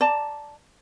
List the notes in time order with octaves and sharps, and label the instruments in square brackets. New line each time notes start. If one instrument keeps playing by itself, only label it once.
[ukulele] D5 A5 A#5